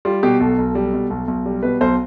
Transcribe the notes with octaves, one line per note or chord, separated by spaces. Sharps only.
G3 F4
B2 G4
B1 A4
B1
G3
B2
B1
B1
G3
B2 B4
B1 C5